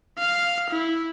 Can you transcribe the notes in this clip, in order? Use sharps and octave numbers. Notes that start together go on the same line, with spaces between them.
F5
E4